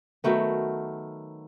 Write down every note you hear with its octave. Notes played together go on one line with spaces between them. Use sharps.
D#3 F#3 A3 B3